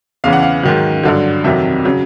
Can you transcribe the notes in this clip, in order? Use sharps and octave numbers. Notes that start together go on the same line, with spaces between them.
E2 C#3 E3 F5
F#5
F5
G#2 D#3 F#3
G2 D3 F#3
F2 C3 D#3 F#3 E5
C#3 F#3